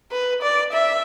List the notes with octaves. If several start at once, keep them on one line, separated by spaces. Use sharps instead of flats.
B4
D5
E5